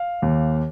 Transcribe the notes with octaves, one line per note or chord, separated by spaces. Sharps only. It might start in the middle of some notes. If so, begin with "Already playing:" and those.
Already playing: F5
D#2